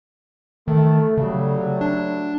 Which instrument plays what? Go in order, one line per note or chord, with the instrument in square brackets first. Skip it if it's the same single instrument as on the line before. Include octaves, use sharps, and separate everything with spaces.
[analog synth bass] D#3 [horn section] A3
[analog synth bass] C#3 [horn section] F#3 G3 A3
[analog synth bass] D4